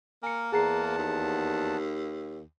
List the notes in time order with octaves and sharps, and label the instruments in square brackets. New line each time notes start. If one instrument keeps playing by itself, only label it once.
[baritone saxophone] A#3 [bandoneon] A#4 [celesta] G#5 C#7
[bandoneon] E2 F#5 A5 [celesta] G#4 A#5 C7
[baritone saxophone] D#2